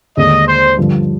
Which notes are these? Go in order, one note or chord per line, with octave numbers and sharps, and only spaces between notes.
D#2 D3 G#3 D#5
C5
G2 D3 F3